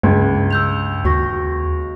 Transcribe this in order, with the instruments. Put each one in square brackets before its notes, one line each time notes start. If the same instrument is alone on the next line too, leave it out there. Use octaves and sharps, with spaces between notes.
[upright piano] C#2 [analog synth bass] G2 [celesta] G#6
[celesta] E6 G6 F7
[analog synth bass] D#2 [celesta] F#4 C#6 A#6